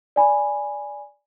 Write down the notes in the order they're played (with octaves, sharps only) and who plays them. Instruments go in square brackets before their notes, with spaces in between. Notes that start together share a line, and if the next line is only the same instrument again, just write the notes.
[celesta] D5 G#5 B5